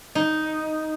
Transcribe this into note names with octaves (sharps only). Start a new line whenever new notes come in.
D#4